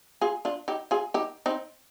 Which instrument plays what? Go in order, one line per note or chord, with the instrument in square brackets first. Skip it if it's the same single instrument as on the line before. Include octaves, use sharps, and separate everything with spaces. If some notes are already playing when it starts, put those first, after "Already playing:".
[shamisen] F4 G#4
D4 F4
D#4 G4
F4 G#4
D#4 G4
C4 D#4